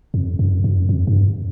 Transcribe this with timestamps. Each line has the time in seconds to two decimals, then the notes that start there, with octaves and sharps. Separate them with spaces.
0.14 F2
0.39 F#2
0.64 F#2
0.89 F2
1.07 G2